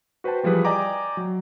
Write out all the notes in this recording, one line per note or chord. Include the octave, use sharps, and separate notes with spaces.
F#4 B4 C5 G5 A5
E3 F3 G3 G#4 B4
D5 D#5 G5 G#5 A#5 D6
F#3